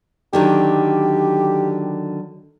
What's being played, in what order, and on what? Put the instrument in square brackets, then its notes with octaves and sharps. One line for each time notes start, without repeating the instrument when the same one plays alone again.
[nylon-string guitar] D3 D#3 F#3 [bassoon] G4